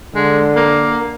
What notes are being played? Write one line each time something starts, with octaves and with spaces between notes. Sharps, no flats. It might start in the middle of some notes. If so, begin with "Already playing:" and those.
D3 G#3
A#3